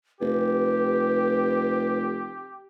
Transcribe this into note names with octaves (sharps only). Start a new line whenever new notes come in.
F1 G4 B4